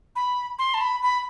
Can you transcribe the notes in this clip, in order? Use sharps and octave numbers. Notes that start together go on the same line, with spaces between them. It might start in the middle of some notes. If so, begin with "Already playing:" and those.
B5
C6
A5
B5
B5